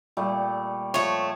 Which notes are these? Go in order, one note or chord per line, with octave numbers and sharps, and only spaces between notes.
A#2 G3 A3
F3 A3 C#5